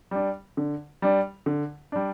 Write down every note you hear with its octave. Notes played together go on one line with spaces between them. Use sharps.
G3 D4
D3
G3 D4
D3
G3 D4